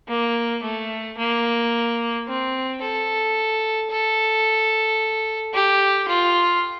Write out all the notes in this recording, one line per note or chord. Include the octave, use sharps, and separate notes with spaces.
A#3
A3
A#3
C4
A4
A4
G4
F4